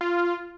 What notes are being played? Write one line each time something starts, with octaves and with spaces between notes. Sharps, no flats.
F4